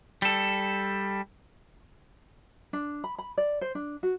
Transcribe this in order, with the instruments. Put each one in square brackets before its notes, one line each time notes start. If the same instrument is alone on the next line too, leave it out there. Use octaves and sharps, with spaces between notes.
[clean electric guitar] G3 A4
[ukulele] D4
B5
B5
D5
C5
D4
F#4